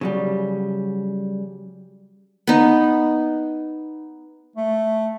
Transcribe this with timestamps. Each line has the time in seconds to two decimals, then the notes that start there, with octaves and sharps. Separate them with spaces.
0.01 C#3 F#3 G3
2.47 B3 D#4
4.56 A3